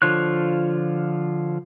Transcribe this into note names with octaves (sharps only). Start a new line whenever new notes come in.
D3 F3 F4 C#5 F#6